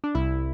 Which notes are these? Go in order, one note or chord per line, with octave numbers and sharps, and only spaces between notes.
D4
C2 E4